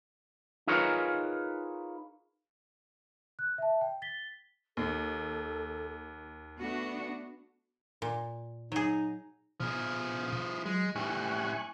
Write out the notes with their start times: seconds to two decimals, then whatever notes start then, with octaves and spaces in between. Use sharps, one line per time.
0.67 D#4 F4 G#4 A#4 B4 C#5
3.39 F#6
3.58 E5 A5
3.81 G5
4.02 A6 B6 G7
4.77 D#2 A4
6.59 A3 B3 D4 F#4
8.02 A#2
8.72 F#3 D#4 G#4
9.60 B2 F3 G#4
10.66 F#3 G#3
10.95 A2 G3 G#5 C#6 F#6